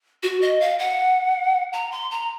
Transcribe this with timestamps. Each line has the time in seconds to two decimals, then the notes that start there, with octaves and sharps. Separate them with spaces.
0.23 F#4
0.42 D#5
0.61 F5
0.79 F#5
1.73 A#5
1.92 C6
2.11 A#5